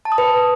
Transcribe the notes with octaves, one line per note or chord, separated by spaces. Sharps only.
A5
D#6
B4